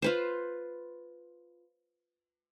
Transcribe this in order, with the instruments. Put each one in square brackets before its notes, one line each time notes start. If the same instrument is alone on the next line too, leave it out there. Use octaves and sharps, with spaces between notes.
[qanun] F4 B4 C5